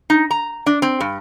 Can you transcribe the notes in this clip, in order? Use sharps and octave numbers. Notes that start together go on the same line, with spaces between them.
D#4
A#5
D4
C4
G2